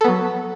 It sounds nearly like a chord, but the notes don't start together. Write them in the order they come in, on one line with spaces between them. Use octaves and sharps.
A4 B3 F#3